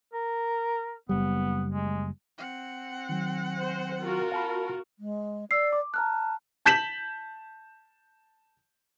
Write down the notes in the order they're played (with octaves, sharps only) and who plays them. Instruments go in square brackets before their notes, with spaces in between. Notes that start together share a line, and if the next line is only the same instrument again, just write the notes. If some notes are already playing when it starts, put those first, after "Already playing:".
[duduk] A#4
[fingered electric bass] F#1 G3 [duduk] B3
[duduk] G#3
[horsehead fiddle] C4 F#5
[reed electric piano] D#3 F#3
[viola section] C5
F4 F#4 A#4
[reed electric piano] F5 A5 B5
[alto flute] G#3
[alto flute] D5 [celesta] E6 C7
[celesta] D6
[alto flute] A5 [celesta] A#5 F6 F#6
[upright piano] A5 G6 B6 E7 F#7